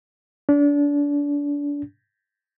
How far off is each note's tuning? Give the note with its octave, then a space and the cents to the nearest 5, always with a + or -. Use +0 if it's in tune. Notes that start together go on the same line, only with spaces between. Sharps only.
D4 -30